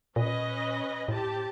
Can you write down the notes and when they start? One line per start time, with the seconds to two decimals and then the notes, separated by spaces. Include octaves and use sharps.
0.16 A#2 C#4 B4 D#5
1.08 A2 C4 G4 A5